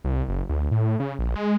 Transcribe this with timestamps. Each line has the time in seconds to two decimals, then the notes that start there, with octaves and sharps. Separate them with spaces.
0.04 C2
0.29 F#1
0.49 D2
0.72 A2
1.00 C#3
1.19 A#1
1.36 G#3